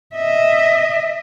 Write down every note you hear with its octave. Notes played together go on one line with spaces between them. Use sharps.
D#5 E5